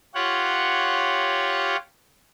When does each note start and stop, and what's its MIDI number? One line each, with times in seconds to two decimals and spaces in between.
0.15 1.76 65
0.15 1.76 67
0.15 1.76 73
0.15 1.76 78